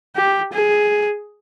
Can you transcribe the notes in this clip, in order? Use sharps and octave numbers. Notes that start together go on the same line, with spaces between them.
G4
G#4